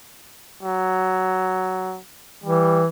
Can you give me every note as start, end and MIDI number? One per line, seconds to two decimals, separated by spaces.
0.63 1.99 54
2.44 2.87 52
2.44 2.81 55